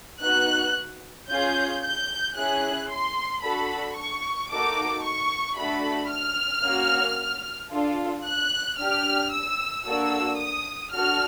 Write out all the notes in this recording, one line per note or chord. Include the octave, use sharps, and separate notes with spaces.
B3 D#4 F#4 F#6
C#4 F4 G#4 G6
G6
C#4 E4 G#4 F#6
C6
D4 F#4 A4 B5
C#6
A#3 D#4 F#4 A4 D6
C#6
A3 D4 F#4 A4 B5
F6
A#3 C#4 F#4
D4 F4 A4
F#6
D4 G4 F6
E6
A#3 D4 F#4 A4 E6
D#6
D4 F#4 A4 F6